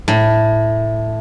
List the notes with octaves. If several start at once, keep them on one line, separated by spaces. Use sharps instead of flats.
A2